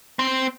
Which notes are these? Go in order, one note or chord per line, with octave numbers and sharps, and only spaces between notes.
C4